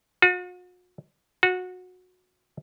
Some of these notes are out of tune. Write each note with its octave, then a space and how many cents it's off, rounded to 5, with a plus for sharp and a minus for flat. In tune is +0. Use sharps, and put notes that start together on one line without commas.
F#4 -45
F#4 -20